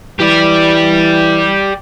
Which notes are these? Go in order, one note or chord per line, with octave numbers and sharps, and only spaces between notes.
E3 G4 D5